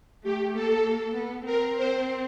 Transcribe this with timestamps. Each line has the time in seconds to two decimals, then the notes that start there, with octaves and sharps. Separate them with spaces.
0.24 A3 G4
0.54 A#3 A4
1.15 B3
1.46 C4 A#4
1.77 C5